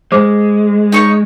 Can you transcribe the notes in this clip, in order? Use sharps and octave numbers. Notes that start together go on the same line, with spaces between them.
G#3 C5 D6
D#4 C#5 C#6